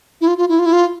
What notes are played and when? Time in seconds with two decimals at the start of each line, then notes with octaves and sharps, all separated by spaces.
0.21 E4
0.28 F4
0.38 F4
0.49 E4
0.59 F4
0.66 E4
0.73 F4